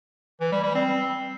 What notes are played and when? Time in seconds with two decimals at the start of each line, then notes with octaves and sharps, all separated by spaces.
0.41 E3
0.52 G3
0.63 G3
0.75 C4